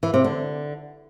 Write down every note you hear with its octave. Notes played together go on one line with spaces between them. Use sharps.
E3
C3
D3